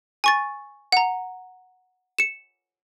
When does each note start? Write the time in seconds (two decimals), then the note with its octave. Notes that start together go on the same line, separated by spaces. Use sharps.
0.24 G#5 C#6 A6
0.92 F#5 A#5
2.19 C#7 E7